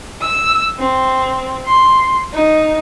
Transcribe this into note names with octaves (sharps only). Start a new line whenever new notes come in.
E6
C4
C6
D#4